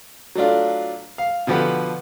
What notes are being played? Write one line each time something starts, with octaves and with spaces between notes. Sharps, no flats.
F#3 A3 D4 F4
F5
B2 D3 F3 G4 B4 F#5